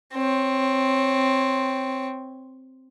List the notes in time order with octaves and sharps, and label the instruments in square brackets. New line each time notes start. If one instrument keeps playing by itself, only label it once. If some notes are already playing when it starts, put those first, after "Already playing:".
[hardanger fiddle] C4 C#5